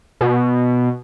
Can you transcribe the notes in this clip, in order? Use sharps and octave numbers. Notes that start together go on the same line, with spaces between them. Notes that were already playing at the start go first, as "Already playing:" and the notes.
B2